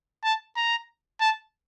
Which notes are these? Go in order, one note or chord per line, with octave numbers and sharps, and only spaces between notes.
A5
A#5
A5